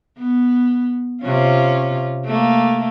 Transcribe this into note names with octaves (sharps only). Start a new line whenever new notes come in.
B3
C3 C#4 F4
A3 A#3